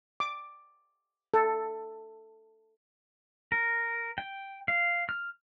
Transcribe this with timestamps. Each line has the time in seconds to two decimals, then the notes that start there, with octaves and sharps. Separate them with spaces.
0.20 D6
1.34 A4
3.52 A#4
4.18 G5
4.68 F5
5.09 F6